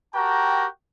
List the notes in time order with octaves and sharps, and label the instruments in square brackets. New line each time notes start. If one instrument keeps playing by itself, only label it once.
[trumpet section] F#4 G4 A#4 G5 A5 A#5